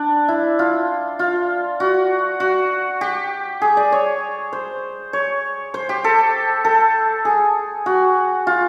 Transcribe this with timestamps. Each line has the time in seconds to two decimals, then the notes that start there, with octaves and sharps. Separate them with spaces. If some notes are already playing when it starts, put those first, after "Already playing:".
Already playing: D4
0.28 E4
0.59 F4
1.19 F4
1.80 F#4
2.40 F#4
3.01 G4
3.62 G#4
3.77 D5
3.92 C#5
4.53 C5
5.13 C#5
5.74 C5
5.89 G4
6.04 A4
6.65 A4
7.25 G#4
7.86 F#4
8.47 F4